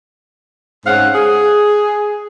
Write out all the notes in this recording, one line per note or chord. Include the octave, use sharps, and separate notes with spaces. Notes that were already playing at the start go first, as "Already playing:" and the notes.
G#2 G#3 C4 C#4 F5 F#5
G#4